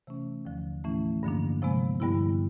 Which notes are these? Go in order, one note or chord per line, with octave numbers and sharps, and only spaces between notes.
C3 E3 A3 C#4
D#2 D3 F3
A2 E3 A3 C#4 E4
G2 D3 F3 A#3 D4
C3 F3 G#3 B3
G2 D3 G3 B3 E4